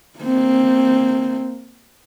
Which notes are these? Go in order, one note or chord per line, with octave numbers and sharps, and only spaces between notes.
A#3 C4